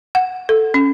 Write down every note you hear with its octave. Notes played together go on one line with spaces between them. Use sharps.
F#5
A4
C#4